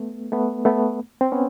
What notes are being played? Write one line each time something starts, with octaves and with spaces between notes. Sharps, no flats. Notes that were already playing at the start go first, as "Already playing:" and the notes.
Already playing: A3 B3
A3 B3
A3 B3
C4
B3 C#4